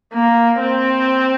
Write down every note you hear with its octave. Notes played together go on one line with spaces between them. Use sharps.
A#3
C4